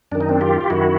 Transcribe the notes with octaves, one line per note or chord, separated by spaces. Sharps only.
F#2 D#3 D4
D#4
C4 D4
F4 G4
G4
F#2 D#3 E4 F#4